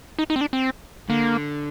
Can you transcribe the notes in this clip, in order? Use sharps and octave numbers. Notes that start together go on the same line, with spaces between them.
D#4
D#4
C4
D4
C4
D3 A#3